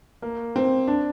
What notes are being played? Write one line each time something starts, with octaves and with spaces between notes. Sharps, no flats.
A#3
C4
D4